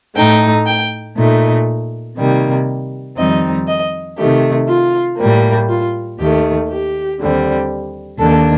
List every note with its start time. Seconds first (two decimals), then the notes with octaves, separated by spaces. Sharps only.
0.16 A2 A3 D#4 G5
0.66 G5
1.16 A#2 A3 D#4
2.17 C3 D#3 G3 A#3
3.16 F2 D#3 G3 C4 D#4 D#5
3.67 D#5
4.17 C3 D#3 A3 G4
4.68 F4
5.17 A2 G3 A#3
5.69 F4
6.19 D#2 D#3 A3 G4
6.68 G4
7.19 D#2 D3 G3 C4
8.19 D#2 D#3 A#3 D4 A4